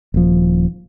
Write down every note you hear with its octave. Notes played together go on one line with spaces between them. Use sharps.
D#1 F3